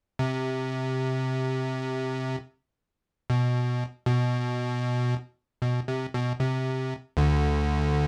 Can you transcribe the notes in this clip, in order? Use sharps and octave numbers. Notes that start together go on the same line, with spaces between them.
C3
B2
B2
B2
C3
B2
C3
D2 D3